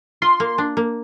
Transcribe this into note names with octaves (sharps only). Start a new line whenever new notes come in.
F4 C6
A#3
D4
A#3